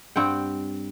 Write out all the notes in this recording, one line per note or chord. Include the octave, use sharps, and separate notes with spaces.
G2 C4 F#5 G5